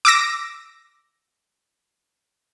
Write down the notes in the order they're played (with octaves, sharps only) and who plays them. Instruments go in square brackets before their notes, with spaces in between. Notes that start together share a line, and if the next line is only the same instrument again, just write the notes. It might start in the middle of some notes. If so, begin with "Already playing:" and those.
[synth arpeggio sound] D6 E6 A#6